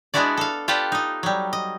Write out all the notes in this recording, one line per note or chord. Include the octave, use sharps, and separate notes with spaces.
G#3 B3 D4 E4 F#4 D5
A4 F5
F4 G4 A4 B4 D5 F#5
D#4 D#5
F#3 G3
D#5